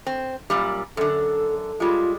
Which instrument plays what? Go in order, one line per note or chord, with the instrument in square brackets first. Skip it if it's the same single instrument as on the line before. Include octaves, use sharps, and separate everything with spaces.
[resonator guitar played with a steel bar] C4
F#2 A#2 G3
[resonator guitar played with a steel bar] F#2 D3 [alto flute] A4
[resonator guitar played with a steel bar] G3 G#3 [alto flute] F4